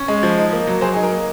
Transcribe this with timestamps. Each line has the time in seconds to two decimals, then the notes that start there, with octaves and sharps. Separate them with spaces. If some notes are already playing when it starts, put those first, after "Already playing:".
Already playing: C#4
0.08 G#3
0.23 F3
0.38 D#4
0.53 A#3
0.67 F#3
0.81 F#3 G#4 C5
0.93 D#4 G#4
1.03 A#4
1.12 A#3